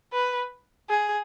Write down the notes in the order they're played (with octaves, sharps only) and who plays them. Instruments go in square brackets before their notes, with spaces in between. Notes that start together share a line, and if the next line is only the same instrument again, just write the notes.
[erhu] B4
G#4